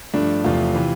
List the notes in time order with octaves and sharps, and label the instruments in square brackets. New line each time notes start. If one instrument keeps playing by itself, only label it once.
[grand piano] G2 F3 A3 D4
E2 C3 F3 A3 F4
C3 E3